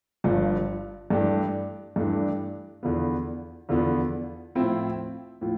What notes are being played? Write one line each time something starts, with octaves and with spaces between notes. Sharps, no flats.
G1 G2 F3
G2 E3 A3 D4 G4
G2 E3 A3 D4 G4
E2 D3 F3 B3
E2 D3 F3 B3
A2 F3 C4 E4
A2 F3